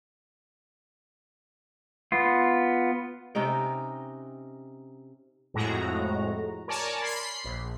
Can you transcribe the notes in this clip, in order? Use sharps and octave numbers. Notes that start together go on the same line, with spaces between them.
B3 F4
C3 C#4 D#4 G5
F2 A2 G#3 F#4 A#5
A#4 C#5 D5 G#5 A5
B5 C6 C7
A#1